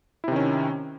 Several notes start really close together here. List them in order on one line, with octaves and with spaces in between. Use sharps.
E4 C3 D#3 C#4